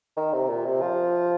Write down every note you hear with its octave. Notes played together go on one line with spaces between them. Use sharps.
D#3
C3
A#2
C3
F3